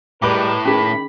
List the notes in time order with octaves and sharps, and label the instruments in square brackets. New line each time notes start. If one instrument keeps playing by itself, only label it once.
[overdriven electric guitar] A2 [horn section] G3 G#3 A#4 [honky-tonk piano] B4 D6 [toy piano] E5
[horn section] D#3 B5 [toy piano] C#4 G#4